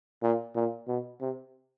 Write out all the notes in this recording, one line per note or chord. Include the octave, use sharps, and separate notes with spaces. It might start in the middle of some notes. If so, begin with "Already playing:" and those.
A#2
A#2
B2
C3